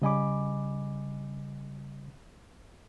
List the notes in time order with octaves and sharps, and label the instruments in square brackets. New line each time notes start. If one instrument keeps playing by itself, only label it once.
[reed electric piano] C#3 G3 D#5 G#5 B5 D6